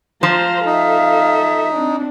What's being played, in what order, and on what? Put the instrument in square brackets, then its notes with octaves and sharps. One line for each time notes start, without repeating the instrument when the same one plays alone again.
[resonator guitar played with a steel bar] F3 [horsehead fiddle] C5 A#5 [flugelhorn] F5
[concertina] D#4 [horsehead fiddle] A4 E5
[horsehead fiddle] C4 D4